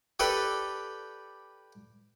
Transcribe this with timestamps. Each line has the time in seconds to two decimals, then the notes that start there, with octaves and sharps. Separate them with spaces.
0.20 G4 A4 B4 D5